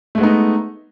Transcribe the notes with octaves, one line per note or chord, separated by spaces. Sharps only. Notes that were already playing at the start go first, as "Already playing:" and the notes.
G#3 A3 B3 D#4